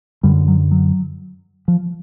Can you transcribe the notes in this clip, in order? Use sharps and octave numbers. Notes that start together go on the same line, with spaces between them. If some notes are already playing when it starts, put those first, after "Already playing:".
F#2 D3 G3
F#3
F#3
F3